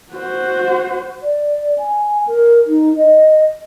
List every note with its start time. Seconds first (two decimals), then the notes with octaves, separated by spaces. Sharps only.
0.12 F#4 C5
1.22 D5
1.78 G#5
2.27 A#4
2.66 D#4
2.96 D#5